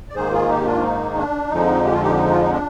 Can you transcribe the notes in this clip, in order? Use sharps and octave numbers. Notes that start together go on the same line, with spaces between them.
D5
G#2 D#3 A#3 G#4 C5
F4 G#4
D#4 G4
D4 F4
D#4
D4
F2 D3 F3 G#3 D#4
G4
F4
D#4 G4
D#4
F4
D#4
D4